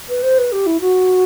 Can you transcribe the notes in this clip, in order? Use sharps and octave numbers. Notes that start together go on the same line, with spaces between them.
B4
C5
B4
G4
E4
F#4